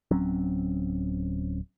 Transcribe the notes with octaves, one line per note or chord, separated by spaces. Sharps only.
D1 F#3 C4 C#4